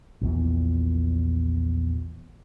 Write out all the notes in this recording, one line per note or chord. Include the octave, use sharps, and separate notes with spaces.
A#1 E2 A#2